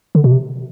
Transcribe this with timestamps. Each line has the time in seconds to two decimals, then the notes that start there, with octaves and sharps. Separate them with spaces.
0.15 D3
0.24 B2
0.32 C3